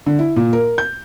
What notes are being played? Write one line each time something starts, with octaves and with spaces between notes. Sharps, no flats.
D3
E4
A#2
A#4
G6